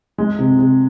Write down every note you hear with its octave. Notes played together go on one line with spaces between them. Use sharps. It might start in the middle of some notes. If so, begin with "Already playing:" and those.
G#3
C3
C3